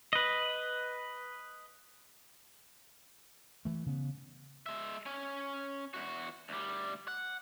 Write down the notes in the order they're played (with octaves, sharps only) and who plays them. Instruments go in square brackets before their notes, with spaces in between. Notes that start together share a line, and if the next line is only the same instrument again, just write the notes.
[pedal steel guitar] B4 D#5
[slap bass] E3 A3
C#3 B3
[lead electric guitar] G#3 E5
C#4 G#5
E2 F#4
D2 G3
F#5